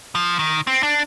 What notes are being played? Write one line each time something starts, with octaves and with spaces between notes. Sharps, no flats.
F3
D#3
C4
D4